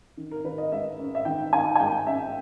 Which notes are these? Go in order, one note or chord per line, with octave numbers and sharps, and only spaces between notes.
D#3
A#4
D#3 B4
D#5
G#3 E5
C#4
E5
D#3 G5
D#3 G#5
G#5
G#3 G5
C#4 E5